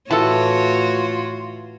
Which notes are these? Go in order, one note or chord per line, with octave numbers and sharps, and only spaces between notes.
A2 E3 F4 F#4 A4 C#5 F#5 A5